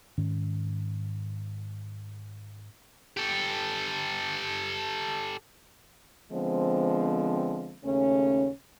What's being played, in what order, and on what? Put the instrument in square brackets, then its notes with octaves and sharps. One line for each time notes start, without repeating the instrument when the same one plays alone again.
[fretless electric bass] G#2 D#3 C#4
[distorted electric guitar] G4 A4
[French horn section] D3 F3 G#3 B3 C4
D#2 C#3 A3 C#4